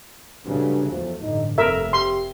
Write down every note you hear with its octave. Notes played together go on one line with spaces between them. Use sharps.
G2 C#3 F#3 A3
E2 F3 A3
A1 G2 D3 D#4
F1 C3 A3 A#4 E5
G4 C6